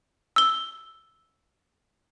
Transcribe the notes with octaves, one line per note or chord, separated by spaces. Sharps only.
E6 G7